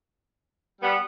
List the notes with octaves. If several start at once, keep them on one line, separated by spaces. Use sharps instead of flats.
G3 B3